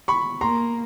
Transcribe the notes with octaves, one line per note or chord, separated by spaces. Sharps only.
B5 C#6
A#3 A#5 C6